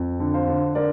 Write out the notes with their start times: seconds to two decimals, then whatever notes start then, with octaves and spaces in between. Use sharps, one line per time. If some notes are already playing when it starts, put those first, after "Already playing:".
Already playing: F2
0.20 D3
0.34 C5 F5
0.47 D3
0.75 D3 A#4 D5